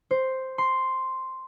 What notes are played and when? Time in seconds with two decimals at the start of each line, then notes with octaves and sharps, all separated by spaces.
0.11 C5
0.58 C6